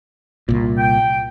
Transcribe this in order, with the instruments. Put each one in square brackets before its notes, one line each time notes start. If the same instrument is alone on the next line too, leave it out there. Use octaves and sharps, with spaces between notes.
[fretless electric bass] C2 A#2
[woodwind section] G5